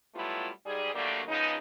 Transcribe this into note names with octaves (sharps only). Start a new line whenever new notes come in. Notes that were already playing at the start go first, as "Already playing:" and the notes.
F#3 G3 A3 B3 E4 F4
G#2 G3 G#4
D3 F#3 G3 A3 A#3
C#3 F3 G#3 B3 D#4